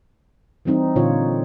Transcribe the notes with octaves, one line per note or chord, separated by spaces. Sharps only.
E3 G3 C4 D#4
A#2 D3 F4 C#5